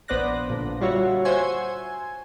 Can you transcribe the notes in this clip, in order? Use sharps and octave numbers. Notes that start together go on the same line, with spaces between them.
A#1 B3 C5 D5 F#6 A#6
A#2 D3
G3 F4 F#4 C#5 E5
C5 E5 F#5 G#5 C#6
G#5